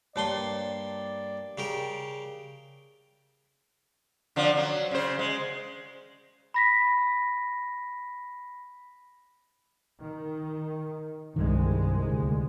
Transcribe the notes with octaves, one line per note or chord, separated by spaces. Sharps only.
G2 A#3 C#5 D5 A5 C6
C#3 G4 A#4
D3 F3 D4
F#3
C#3 C5
G#3
B5 A#6 B6
D#3
C2 G2 D#3 G#3
D2